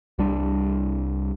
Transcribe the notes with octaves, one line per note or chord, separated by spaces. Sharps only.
C2 G3 D4